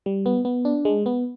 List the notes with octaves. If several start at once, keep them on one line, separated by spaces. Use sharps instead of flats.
G3
B3
B3
D4
G#3
B3